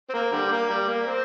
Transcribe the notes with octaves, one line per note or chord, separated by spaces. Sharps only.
C4
A#3
D3 G3
A#3
G3
A#3
C4